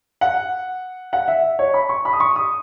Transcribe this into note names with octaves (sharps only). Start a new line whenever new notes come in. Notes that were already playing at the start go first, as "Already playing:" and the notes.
F#5
F#5
E5
C#5
B5
C#6
B5
D#6
C#6
D#6